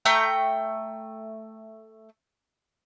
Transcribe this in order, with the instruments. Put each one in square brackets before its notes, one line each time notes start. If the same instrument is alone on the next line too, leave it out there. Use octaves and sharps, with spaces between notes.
[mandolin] A3 G5 A#5